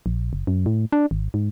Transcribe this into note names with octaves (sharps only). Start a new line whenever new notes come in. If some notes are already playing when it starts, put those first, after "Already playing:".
A#1
F#1
F#2
A2
D4
G#1
G#2